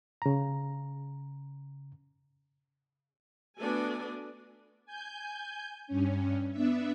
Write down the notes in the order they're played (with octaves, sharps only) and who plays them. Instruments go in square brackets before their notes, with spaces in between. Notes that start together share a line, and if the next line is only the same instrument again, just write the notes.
[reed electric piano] C#3 A#5
[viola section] A3 B3 D4 F#4 A4 G#5
[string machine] G#5 G6
G2 C#4
B3 D4 E5